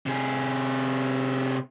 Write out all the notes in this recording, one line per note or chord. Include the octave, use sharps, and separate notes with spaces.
C3 G#4